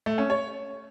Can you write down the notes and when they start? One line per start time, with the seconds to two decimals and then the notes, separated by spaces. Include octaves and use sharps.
0.06 A3
0.18 C#4
0.30 C#5